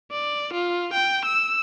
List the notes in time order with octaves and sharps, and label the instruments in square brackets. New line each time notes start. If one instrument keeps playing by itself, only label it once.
[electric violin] D5
F4
G5
E6